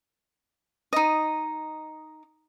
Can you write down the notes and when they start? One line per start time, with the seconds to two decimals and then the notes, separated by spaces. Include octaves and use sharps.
0.93 D#4 D#5